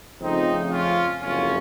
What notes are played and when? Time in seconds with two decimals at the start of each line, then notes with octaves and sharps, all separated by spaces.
0.21 F2 C#3 F3 A3 C4 D#4
0.71 C#4 F4
1.21 F#1 F2 C3 F#3 C#4 F4